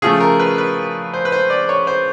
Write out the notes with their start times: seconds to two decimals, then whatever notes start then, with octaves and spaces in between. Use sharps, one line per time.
0.02 C#3 F3 A3 G#4
0.20 A#4
0.39 B4
0.58 B4
1.14 C5
1.25 B4
1.32 C5
1.50 D5
1.69 C#5
1.87 C5